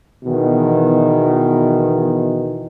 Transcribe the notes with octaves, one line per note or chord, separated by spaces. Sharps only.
E2 B2 D#3 E3